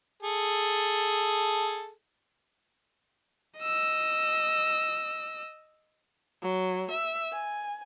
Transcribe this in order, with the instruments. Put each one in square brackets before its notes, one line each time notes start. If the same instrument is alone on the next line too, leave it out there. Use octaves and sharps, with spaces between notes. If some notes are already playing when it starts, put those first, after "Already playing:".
[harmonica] G#4 A4
[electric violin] D#5 E6
[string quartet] F#3
E5
G#5